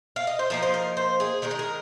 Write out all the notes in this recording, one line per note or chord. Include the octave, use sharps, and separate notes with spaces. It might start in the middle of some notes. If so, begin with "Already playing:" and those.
F5
D#5
C5
F3 A#3 D#4 A#4
C5
A#4
C5
G#4
D#3 G#3 D#4 A#4
G#4
A#4